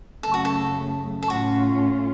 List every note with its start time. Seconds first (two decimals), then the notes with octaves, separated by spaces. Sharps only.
0.23 F#2 C#3 A3 A4
0.34 F#4
0.45 A4
1.23 A4
1.30 A2 A3 C#4 F4 F#4